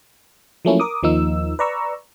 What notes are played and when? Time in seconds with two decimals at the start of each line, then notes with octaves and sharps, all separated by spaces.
0.65 F3 F#3 A3 A#3 C#4 E4
0.80 A#4 D6 D#6
1.03 D#2 F3 A#3 D#4 E6
1.59 B4 D5 A#5 C#6 E6